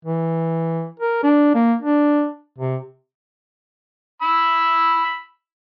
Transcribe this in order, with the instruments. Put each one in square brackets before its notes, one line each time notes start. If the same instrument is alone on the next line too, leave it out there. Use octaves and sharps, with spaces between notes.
[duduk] E3
A#4
D4
A#3
D4
C3
[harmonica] B5 E6